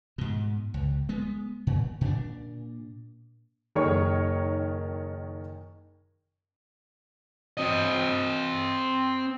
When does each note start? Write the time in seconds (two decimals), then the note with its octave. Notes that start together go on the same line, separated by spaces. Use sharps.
0.18 G#2 B2
0.74 C#2
1.09 G#3 B3
1.67 A#2
2.01 A#2 D4
3.75 F#1 D#3 A#4 C#5 C#6
7.57 C4 D#5